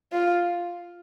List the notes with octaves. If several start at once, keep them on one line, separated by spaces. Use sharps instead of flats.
F4